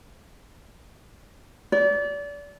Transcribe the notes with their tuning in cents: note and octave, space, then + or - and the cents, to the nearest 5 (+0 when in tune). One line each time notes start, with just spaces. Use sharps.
D5 -30